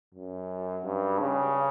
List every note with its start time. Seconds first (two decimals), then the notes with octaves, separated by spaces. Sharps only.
0.14 F#2
0.85 G2
1.20 C#3